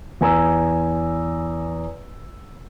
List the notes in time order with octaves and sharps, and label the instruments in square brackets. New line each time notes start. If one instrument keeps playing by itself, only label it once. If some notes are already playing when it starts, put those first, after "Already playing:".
[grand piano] E2 G#5 A#5 E6